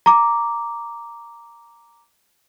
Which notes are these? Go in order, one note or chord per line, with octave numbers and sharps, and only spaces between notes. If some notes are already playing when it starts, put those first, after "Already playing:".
A#5 D6